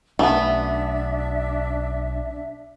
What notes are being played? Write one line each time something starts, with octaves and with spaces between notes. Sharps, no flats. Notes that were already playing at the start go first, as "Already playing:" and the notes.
B1 A3 B3 C#4 D4 E5